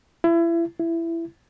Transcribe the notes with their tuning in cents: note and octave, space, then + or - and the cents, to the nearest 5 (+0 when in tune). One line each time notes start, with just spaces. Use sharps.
E4 +30
E4 +15